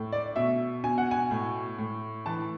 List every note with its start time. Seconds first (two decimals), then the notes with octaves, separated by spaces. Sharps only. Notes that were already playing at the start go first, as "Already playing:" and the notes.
Already playing: A2
0.12 D5
0.36 B2 E5
0.84 B2 G#5
0.98 F#5
1.11 G#5
1.31 A2
1.79 A2
2.26 E3 A5